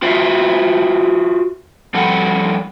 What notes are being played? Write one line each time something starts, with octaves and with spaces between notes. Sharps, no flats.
F4 F#4 C5 E5
F3 G3 A4 F#5